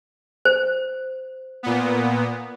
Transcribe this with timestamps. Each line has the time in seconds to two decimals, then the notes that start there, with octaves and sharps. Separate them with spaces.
0.45 C5
1.63 A#2 B3